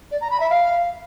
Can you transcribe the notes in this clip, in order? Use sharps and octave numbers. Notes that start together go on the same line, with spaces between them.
D5
A#5
B5
E5
F5